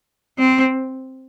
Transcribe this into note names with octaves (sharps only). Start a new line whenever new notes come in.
C4